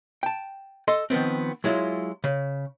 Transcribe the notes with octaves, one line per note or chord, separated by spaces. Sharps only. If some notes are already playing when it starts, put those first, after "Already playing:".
G5 A5
A4 D#5 C6
D#3 F3 B3 C4
F#3 G#3 E4 F4
C#3